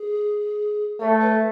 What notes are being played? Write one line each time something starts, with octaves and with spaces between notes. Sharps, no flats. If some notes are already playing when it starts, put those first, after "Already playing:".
Already playing: G#4
A3 C#5
B4